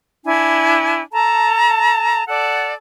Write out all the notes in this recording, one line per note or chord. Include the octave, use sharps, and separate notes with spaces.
D4 E4 G#5
A4 A5 A#5
A4 D5 F#5